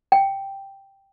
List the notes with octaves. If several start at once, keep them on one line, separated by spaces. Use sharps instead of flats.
G5